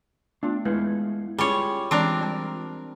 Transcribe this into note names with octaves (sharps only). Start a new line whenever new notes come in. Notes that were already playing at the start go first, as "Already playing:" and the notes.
A3 B3 D4 F4
G#3 E4 B4 F5
G3 C#4 F4 G#4 C#5
E3 G#3 C4 D4 A#4 D5
G3 A5